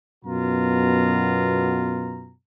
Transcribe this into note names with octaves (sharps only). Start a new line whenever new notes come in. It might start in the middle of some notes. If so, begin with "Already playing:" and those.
F#2 B2 B3 F4 A#5